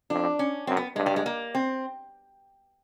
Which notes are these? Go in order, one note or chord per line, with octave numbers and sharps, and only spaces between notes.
F2 D4
C#4
F#2 C4
B3
G2 G#3
G3
G#3
A#3
C4